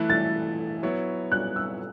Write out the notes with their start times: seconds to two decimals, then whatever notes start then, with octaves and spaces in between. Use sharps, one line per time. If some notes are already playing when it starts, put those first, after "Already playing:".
Already playing: E3 A3 E4 F#6
0.10 A6
0.83 F#3 B3 E4 C#5
1.32 F#6
1.56 E6